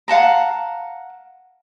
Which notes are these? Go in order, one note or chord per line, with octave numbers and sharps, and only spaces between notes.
F5 F#5 A5 A#5